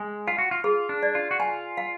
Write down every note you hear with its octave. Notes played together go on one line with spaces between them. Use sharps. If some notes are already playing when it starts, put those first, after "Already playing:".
Already playing: G#3 G#5
F4 F5
F#4
F4
F4 G#4
D4
D5
F4
F#4
F4 G#5
F5